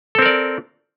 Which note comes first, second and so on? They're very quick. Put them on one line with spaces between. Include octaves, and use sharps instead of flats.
A4 C4 A#4 D5